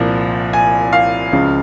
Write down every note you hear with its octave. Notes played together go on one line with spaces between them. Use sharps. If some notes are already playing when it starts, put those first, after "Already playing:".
Already playing: C2 A#2 F3
G#5
F5
C#2 C#3 F3